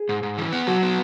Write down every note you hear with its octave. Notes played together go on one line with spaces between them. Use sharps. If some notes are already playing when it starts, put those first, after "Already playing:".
Already playing: G#4
G#2
G#2
E3
B3
F#3 F#4
B3